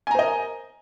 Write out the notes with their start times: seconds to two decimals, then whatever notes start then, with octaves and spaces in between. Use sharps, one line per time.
0.07 G#5
0.11 A#5
0.15 C5
0.19 D#5
0.23 A#4